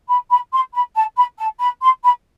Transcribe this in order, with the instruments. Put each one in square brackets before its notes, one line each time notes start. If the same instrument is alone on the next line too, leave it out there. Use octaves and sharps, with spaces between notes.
[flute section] B5
B5
C6
B5
A5
B5
A5
B5
C6
B5